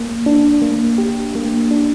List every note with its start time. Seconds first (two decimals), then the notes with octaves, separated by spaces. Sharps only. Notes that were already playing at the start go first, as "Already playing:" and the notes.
Already playing: A#3
0.26 D4
0.62 A#3
0.98 G4
1.35 A#3
1.71 D4